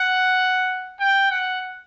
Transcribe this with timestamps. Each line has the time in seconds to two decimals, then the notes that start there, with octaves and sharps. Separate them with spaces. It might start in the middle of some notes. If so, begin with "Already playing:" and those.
Already playing: F#5
1.00 G5
1.31 F#5